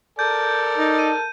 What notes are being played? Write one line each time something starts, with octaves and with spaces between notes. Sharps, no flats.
A4 A#4 D5 A5 G6
D#4
D#7